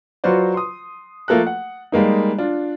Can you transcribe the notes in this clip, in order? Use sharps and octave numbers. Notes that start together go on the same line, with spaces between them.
F#3 F4 F#4 B4 C5 D5
C6 D#6
F3 A3 A#3 A4 A#5 F#6
F#5
G3 G#3 A#3 D#4
D4 F4